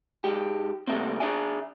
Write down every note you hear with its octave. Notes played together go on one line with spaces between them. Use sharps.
G#2 G#3 G4
C3 E3 G3 A3 A#3 C4
D4 G#4 D5 E5 G#5